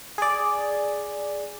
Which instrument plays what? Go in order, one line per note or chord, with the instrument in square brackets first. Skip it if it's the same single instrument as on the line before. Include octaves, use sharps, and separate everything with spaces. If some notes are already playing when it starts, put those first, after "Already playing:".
[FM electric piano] G#4 D5